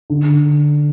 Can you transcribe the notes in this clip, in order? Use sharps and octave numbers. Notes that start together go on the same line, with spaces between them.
D3